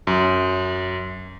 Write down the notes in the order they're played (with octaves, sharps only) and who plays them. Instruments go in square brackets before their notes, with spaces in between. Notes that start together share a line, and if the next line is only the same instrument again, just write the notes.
[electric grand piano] F#2